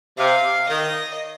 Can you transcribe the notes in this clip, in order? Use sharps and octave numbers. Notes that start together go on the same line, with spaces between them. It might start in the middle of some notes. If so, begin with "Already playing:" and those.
C3 F5
D#3 D#5